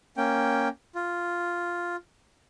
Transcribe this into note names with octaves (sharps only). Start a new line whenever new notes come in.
A#3 C#4 G5
F4